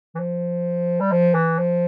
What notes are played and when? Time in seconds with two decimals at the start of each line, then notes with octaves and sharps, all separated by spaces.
0.15 E3
0.19 F3
1.00 G3
1.11 F3
1.35 E3
1.59 F3